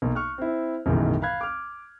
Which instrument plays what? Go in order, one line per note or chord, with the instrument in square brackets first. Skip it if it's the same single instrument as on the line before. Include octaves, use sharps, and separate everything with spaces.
[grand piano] B1 A#3
C#6 F6 F#6
C4 E4
B1 F#2 A2 D#3 E3 G#3
F5 B5 F#6 G#6
D6 F6